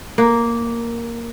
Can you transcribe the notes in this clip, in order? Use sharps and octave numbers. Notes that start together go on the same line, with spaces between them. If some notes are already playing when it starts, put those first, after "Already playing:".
A#3